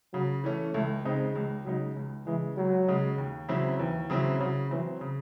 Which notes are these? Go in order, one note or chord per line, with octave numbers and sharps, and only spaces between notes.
C#3 F#3
E3 A3 C#4
C#2 A3
C#3 G#3 C4 D#4
C#2 G#3
C#3 F#3 G#3 D#4
C#2
C#3 E3 G#3
C#2 F#3
C#3 G#3
D#2
C#3 F#3 C4 E4
D#2 E3
C#3 F#3 C4 E4
C#3 F#3
E3 F#3 C4
C#3